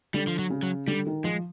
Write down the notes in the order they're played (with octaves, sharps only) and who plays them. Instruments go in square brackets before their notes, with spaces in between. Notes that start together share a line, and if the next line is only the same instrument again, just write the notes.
[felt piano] D3 [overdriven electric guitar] G3
[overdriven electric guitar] F3
F#3
[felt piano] C#3
[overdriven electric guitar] F#3
[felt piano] D3 [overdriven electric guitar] G3
[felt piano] D#3
[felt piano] F3 [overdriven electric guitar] G#3